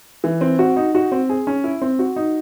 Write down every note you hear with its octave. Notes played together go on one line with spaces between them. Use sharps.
E3
C4
F#4
D#4
F#4
C4
G#4
C#4
E4
C4
F#4
D#4